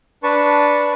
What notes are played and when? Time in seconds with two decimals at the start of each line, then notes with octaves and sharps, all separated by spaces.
0.23 D4 B4 A5 C#6